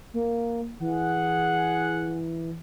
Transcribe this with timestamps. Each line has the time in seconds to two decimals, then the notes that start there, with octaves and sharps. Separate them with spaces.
0.14 A#3
0.80 E3 G#4 F#5